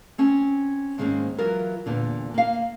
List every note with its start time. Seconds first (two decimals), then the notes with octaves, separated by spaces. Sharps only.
0.18 C4 C#4 G#5
0.98 G#2 D#3 G#3 A#3 C4 C#4
1.38 E3 F#3 F4 A#4
1.86 E2 A#2 D3
2.34 A#3 F5